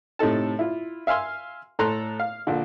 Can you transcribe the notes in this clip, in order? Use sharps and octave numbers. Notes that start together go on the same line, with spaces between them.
A2 C3 D#4 A4 A5
E4 F4
E5 F5 G#5 C6 F6
A2 A4 A#5 C6 F#6
F5
A#1 D3